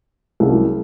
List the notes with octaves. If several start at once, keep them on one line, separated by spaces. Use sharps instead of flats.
C2 C3 F#3 C#4 G#4